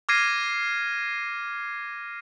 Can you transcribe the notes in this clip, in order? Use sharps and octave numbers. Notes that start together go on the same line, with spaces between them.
D6 F6 G#6 A#6 C7 D#7